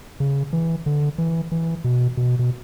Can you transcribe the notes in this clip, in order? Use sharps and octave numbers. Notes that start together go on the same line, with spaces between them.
C#3
E3
D3
E3
E3
B2
B2
B2